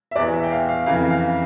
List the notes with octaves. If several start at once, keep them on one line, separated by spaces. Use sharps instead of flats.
E5
E2 E3 D5
E5
G5
F5
F5
F2 C#3 E3 F5
F5